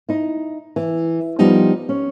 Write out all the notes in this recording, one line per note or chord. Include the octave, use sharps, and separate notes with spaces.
D#4 E4
E3
F3 G3 B3 D#4 G4
C#4